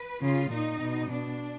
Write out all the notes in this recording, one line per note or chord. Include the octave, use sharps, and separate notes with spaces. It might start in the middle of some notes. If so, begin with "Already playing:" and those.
Already playing: B4
C#3 F4
A#2 D#4
B2
B2 D4